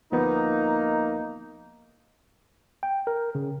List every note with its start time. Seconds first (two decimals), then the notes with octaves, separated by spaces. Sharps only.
0.12 D2 F3 A#3 B3 D#4
2.83 G5
3.07 A#4
3.35 C#3